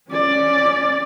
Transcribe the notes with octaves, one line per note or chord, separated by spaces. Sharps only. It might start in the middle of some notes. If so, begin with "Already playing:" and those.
C#4 D5